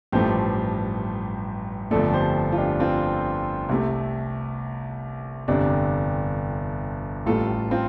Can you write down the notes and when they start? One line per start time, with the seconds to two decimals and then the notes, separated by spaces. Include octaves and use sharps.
0.12 A1 G2 F3 A3 G4 C5
1.91 G1 F2 F3 A3 A4 D5
2.14 G4 C5
2.52 F4
2.58 D4 G4
2.80 C4 F4
3.69 C2 C3 A3
5.48 G1 F2 C3 D4
7.26 A1 A2 G3 F4 A4
7.71 C4 F4